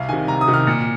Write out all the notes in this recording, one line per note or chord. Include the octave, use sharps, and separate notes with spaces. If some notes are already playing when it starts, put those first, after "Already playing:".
Already playing: C2 F5
C3 D#3 G#5
C2 A#5
D#6
C3 D#3
F6
A#2